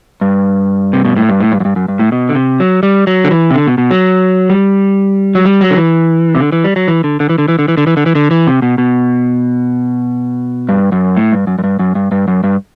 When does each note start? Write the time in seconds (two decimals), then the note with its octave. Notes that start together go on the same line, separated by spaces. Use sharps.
0.21 G2
0.93 C3
1.05 B2
1.16 A2
1.29 G2
1.40 A2
1.52 G2
1.60 F#2
1.65 G2
1.76 F#2
1.88 G2
1.99 A2
2.12 B2
2.29 D3
2.35 C3
2.60 F#3
2.83 G3
3.07 F#3
3.24 D3
3.31 E3
3.51 C3
3.54 D3
3.67 B2
3.78 B2
3.91 F#3
4.50 G3
5.35 F#3
5.45 G3
5.61 F#3
5.71 D3
5.77 E3
6.35 C3
6.40 D3
6.52 E3
6.64 G3
6.76 F#3
6.88 E3
7.04 D3
7.20 D3
7.29 E3
7.38 D3
7.48 E3
7.59 D3
7.68 E3
7.77 D3
7.87 E3
7.97 D3
8.06 E3
8.15 D3
8.31 E3
8.47 C3
8.62 B2
8.78 B2
10.69 G2
10.92 F#2
11.17 A2
11.33 G2
11.47 F#2
11.59 F#2
11.64 G2
11.79 F#2
11.95 G2
12.12 G2
12.28 F#2
12.44 G2